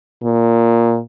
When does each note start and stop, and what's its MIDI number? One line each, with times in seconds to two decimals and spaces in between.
0.23 0.99 46